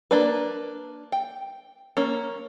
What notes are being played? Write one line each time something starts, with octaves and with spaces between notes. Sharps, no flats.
A#3 D4 B4
G5
A#3 C#4